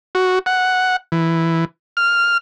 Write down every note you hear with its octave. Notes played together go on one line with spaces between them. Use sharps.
F#4
F#5
E3
F6